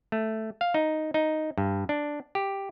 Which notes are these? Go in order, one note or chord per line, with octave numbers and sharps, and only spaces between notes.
A3
F5
D#4
D#4
G2
D4
G4